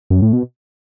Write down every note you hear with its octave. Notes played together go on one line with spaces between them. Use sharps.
F#2
A2
B2